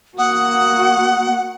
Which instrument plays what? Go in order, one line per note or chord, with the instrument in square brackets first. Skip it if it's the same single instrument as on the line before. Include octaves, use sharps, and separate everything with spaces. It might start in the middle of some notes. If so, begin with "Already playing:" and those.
[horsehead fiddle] A#3 F#4 [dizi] F#5 [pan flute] D#6